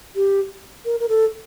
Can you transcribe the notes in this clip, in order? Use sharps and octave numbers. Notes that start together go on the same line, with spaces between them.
G4
A#4
A#4
A4